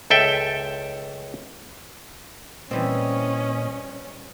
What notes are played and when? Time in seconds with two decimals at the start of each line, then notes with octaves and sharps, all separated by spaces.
0.10 C#2 A4 E5 G5
2.71 A#2 E3 G3 C4 C#4 D#5